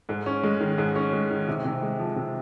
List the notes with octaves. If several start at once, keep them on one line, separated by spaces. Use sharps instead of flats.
G#2
C#4
G#3
D#3
G#2
C#4
G#3
D#3
C3
C3
G#3
F3
C3